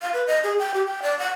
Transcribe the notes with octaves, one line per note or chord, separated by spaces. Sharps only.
F5
B4
D#5
G#4
G5
G4
G5
D5
F#5